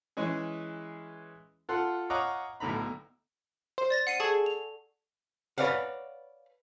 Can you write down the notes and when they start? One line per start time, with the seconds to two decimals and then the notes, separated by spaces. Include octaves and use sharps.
0.17 E3 G#3 C#4 G#4
1.69 F4 A4 F#5 C6
2.10 C#5 D#5 F5 F#5 A#5 D6
2.60 B1 A2 D3 A#5 B5
3.78 C5
3.90 D5 A6 A#6
4.07 F#5 C7 D#7
4.20 G#4 A4 A5 C#6
4.46 F7
5.58 B4 C#5 D5 F5 F#5